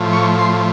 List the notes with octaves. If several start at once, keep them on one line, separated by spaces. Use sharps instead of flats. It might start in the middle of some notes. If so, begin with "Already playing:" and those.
Already playing: A2 F3
C#6
C6